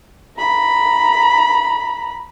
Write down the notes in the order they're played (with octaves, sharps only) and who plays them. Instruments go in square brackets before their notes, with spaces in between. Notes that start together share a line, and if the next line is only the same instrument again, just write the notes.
[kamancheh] A#5 B5